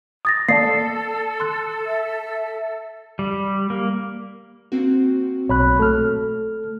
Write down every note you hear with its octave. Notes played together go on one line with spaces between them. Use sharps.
D#6 A6 A#6
A#3 A4 D5 A5 C7
C6 F#6
E5
G3
A#3
A#3 C4 F#4
B1 C#5 B5 F#6
A3 A4 F6